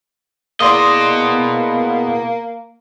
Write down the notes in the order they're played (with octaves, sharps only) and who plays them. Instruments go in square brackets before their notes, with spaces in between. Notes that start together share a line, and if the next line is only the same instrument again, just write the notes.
[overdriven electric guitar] B2 D#5 [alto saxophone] A#3 [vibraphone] E4 G#4 [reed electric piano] D5 C6 D#6